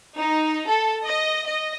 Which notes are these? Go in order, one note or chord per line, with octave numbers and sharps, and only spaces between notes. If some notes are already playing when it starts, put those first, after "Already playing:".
D#4
A4
D#5
D#5